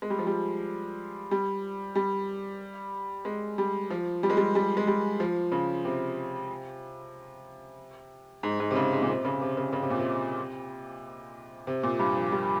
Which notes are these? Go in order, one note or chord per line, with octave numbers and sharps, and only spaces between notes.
G#3
G3
F3
G3
G3
G3
G#3
G3
F3
G3
G#3
G3
G3
G#3
G3
F3
C#3
C3
G#2
G#2
C3
C#3
G#2
A#2
C3
C#3
C3
C#3
C#3
C3
A#2
C3
C3
A#2
G2
F3
G3